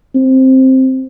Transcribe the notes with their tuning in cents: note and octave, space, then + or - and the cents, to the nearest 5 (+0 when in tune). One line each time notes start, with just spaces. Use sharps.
C4 +5